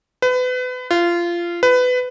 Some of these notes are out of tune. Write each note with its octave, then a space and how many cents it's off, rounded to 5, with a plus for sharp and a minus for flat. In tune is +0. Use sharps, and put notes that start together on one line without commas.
B4 +30
F4 -20
B4 +20